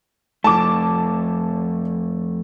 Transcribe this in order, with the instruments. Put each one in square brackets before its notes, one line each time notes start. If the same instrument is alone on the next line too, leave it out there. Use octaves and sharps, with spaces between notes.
[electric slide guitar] F2 A3 [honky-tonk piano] A5 D6